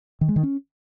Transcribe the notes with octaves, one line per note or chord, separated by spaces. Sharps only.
D#3
G#3
D#3
C#4